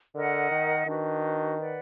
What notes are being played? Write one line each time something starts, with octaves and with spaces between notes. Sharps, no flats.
D3 A#4 D#5 F#5
D#3
D#3 D4 F#4 B4
B4 D5 F#5